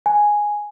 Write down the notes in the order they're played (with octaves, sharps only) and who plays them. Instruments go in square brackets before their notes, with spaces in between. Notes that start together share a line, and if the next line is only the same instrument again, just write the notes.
[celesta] G#5